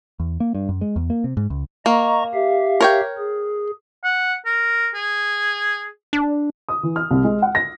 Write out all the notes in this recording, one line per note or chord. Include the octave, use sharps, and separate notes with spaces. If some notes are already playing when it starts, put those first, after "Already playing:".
E2
A#3
G2
F#2
G#3
E2
A#3
C3
G#2
C#2
A#3 D#5 A#5 C#6
G4 E5 F5
A#4 C#5 G5
G#4
F#5
A#4
G#4
D4
D#6
E3
F6
C2
G#3
F#5
A#6